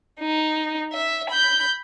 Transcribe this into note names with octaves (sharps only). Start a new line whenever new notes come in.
D#4
E5
B5 G6